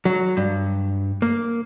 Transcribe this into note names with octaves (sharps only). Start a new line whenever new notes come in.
F#3
G2
A#3